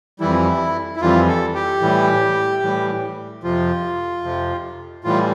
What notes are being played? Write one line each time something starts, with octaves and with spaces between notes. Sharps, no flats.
F2 E3 G3 E4
E4
F2 E3 G3 F4
A4
G4
A2 E3 G3
A2 E3 G3
F2 C3 F3 F4
F2 C3 F3
A2 E3 G3 F4